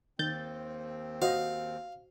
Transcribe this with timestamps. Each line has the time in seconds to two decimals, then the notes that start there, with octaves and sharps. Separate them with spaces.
0.19 D#2 D#3 C4 G6 A6
1.22 F#4 C5 D#5 F5